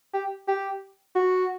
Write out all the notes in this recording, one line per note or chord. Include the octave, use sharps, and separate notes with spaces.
G4
G4
F#4